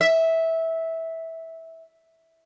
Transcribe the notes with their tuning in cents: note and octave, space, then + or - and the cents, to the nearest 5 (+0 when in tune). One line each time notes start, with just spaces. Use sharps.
E5 -15